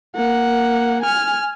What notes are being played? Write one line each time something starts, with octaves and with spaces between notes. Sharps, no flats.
A#3 F#5
G#5 F6